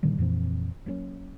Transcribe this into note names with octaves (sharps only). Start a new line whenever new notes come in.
A#2 D3 D#3 G3
F2 A#2 E3 C4
F#3 A#3 B3 C#4